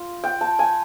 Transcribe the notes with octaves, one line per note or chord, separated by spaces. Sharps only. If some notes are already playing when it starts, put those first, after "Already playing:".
Already playing: F4
G5
A5
G#5